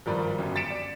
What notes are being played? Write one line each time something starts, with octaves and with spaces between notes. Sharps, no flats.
G#1 G2 F3 A#4 D5 B5
G1 F#2
A6 B6 C#7 D7 E7
D5